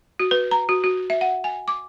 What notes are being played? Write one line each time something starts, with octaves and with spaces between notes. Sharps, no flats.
F#4
B4
A#5
F#4
F#4
E5
F#5
G#5
D6